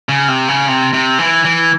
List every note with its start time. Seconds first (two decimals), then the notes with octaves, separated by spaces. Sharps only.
0.09 C#3
0.28 C3
0.48 C#3
0.68 C3
0.93 C3
1.19 E3
1.45 E3